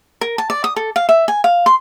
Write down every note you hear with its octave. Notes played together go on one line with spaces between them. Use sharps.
A#4
A5
D5
D#6
A4
F5
E5
G#5
F5
C6